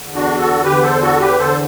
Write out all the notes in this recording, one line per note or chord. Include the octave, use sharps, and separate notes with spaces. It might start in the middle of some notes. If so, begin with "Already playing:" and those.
Already playing: E2 D3
D4 F#4
F#4 A4
E2 D3 G4 B4
A4 C5
F#4 A4
G4 B4
E2 D3 A4 C5